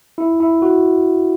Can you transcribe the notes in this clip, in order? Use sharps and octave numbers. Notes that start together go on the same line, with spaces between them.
E4
E4
F#4